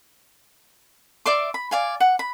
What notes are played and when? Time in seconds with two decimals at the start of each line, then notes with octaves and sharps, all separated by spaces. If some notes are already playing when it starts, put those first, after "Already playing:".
1.26 D5 E5 C6 D6
1.54 B5
1.71 D5 F5 G#5
2.00 F#5
2.19 B5